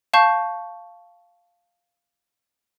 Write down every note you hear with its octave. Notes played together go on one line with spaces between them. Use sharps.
F5 A5 C#6 G6